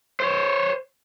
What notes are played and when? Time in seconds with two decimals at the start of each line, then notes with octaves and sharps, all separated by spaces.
0.20 C5 C#5